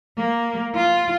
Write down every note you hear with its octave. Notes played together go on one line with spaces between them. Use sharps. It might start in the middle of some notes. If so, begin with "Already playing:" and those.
A#3
F4